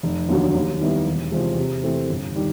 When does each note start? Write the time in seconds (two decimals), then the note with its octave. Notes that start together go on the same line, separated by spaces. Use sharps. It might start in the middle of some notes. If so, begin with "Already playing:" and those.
0.03 F1
0.29 D#2 D3 F#3
0.54 D#2
0.81 D#3 G3 B3 E4
1.07 E1
1.31 E2 C3 F3 G#3
1.57 C3
1.84 E3 A3 C4
2.09 G1
2.35 D#3 G3